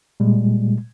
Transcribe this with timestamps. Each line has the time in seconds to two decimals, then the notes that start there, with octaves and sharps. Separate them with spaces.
0.20 A#2 G3 G#3